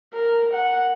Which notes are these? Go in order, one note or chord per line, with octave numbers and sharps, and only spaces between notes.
A#4
F#5